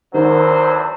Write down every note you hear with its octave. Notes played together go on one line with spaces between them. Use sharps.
E2 D3 D#3 F#3 C5